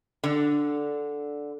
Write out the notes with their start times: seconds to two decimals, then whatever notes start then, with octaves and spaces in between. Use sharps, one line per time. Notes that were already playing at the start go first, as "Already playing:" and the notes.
0.24 D3